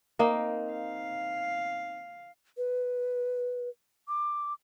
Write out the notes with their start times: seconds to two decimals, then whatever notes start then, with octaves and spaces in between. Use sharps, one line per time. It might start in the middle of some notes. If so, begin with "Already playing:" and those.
0.19 A#3 C4 D#4
0.71 F5
2.57 B4
4.08 D6